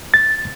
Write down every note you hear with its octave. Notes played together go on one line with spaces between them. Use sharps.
A6